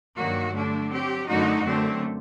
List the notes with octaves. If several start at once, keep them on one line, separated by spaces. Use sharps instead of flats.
G2 D#3 F#3 A#3 F#4
D3 A3 D4
F#3 C4 G4
F#2 D3 A3 D#4 F#4
F#2 D3 A3 C4